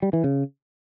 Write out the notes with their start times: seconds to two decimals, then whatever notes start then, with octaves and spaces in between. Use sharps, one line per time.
0.02 G3
0.13 E3
0.24 C#3